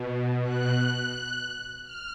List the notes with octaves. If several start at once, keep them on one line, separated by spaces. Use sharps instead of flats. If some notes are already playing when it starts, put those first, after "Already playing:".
Already playing: B2
F#6
F6